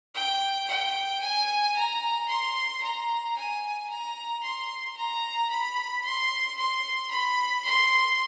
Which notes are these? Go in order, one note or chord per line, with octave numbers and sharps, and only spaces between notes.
G5
G5
G#5
A#5
C6
A#5
G#5
A#5
C6
A#5
B5
C6
C6
B5
C6